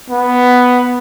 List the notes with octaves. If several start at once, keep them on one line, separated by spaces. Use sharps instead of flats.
B3